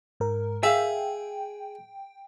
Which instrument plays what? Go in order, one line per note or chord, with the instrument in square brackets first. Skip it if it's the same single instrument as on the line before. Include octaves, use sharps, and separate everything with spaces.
[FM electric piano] G#2 A#4
[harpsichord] G#4 [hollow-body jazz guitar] E5 F5 [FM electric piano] G5